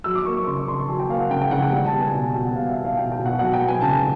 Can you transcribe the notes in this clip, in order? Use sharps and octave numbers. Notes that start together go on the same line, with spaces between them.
F#3 E6
D6
A#3 C#6
C#6
C#3 C6
C#6
C#3 C6
A5
F#3 G#5
G5
A#3 F5
F#5
C#3 G5
G5
C#3 F#5
G5
G3
A5
B3
G#5
B2
B2 G5
F#5
G3 F5
E5
B3
F5
B2 G5
G5
B2
F#5
F#3 F#5
G5
B3
G#5
C#3 A5